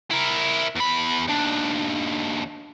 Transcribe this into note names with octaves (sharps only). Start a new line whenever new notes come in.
E4 A#4
E2 B5
D#2 D4